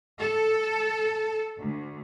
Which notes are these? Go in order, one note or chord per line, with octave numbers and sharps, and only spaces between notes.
A4
D2